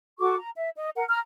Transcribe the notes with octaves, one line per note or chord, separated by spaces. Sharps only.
F#4 A4 C#6 D6
A#5
E5
D#5
A#4 F#5
A#5 F6